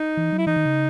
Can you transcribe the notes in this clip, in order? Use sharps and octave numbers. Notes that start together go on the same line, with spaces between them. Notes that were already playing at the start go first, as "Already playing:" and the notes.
Already playing: D#4
E3
F#3
E4
E3 D#4
D#3
C#3